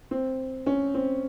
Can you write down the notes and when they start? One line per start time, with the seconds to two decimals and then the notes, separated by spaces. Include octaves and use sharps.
0.11 C4
0.66 C#4
0.94 C4